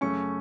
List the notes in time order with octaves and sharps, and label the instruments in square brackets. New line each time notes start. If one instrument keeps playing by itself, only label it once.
[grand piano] F#2 C#3 A3 C#4 C#6